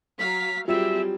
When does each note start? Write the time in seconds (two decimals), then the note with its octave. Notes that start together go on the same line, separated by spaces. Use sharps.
0.19 F#3 F5 A#5 B6
0.68 F#3 G3 C4 F4 G4 G#4 E5 E7